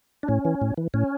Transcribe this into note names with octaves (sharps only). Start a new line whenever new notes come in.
D4
A2 C#4
E3
A2
E3
A2 C#4